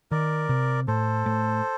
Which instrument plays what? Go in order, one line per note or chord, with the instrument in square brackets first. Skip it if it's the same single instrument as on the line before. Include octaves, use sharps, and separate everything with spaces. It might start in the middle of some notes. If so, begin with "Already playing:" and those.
[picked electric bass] D#3 [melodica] A#4 D5
[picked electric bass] C3
[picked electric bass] A2 [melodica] A4 C5
[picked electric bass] A2